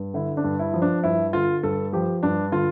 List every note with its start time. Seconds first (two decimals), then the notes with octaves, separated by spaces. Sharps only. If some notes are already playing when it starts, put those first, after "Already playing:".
Already playing: G2
0.14 D3 E4
0.37 D4
0.44 G2
0.59 E4
0.73 F3
0.82 D4
1.04 G2 E4
1.33 D3 F4
1.63 G2 A4
1.93 F3 G4
2.23 G2 D4
2.52 D3 F4